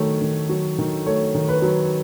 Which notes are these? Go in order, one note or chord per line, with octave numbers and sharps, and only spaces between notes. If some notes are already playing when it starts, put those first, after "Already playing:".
Already playing: D#3 F#3 A3 C#5
D#3
F#3
D#3
A3 C#5
D#3
B4
F#3